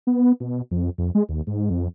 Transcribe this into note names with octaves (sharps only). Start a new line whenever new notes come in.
B3
B2
F2
F2
G#3
D#2
G#2
F2